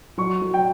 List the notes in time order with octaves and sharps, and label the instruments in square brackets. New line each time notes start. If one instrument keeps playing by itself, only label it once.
[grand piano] F#3 [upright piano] C#6
[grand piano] F#3
[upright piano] G5